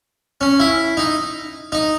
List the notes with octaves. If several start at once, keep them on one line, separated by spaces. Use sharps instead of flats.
C#4
E4
D#4
D#4